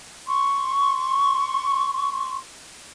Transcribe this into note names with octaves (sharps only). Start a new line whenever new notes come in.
C6 C#6